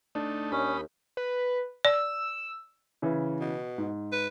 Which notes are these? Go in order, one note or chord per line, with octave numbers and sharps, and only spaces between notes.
A3 D4 D#4
D#2 C#4 D#4 B5
B4
D5 E6
C#3 E3
B2
G#2
B4